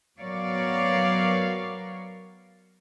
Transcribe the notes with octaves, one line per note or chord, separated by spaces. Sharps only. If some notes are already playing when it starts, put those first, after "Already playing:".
F#3 B3 A#4 C#5 D5 F5